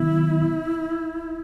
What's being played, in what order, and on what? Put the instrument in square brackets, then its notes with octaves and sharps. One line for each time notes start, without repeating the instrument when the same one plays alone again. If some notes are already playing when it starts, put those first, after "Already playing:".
Already playing: [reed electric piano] C3 D#3 F#3 B3 [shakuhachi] E4